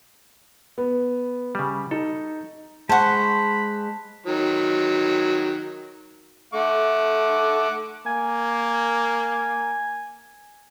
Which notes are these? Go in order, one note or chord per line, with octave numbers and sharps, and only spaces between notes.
B3
C#3 G3
D#4 A4
G#3 C5 F#5 A5 B5 C#6
D#3 F#3
A3 F#5 D6
A#3 G#5